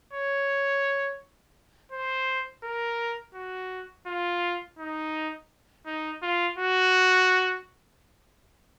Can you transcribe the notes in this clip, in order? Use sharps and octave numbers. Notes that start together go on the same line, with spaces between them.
C#5
C5
A#4
F#4
F4
D#4
D#4
F4
F#4